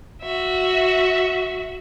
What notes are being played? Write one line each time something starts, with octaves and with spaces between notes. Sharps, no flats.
F#4 E5